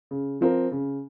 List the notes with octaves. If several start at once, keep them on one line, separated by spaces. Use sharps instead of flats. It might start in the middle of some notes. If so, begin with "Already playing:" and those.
C#3
F3 C4 F4 A#4
C#3